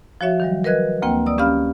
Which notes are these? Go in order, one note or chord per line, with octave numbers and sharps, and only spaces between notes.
F3 F#4 C#5 E5
D#3 F#3 G3
A#4 B4 D#5 F#6 G#6
D2 A#3 C4 G5
D5 D#6 E6
C#4 G4 F5 B5 F6